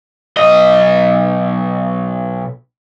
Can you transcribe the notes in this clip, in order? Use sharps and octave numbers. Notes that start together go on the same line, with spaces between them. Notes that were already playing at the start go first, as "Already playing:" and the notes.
B1 D#5